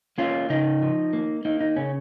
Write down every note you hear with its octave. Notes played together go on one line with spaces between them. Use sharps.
A#3 C#4 F4
C#3 D#4
F3
A#3
A#3 D#4
D#4
C#3 C#4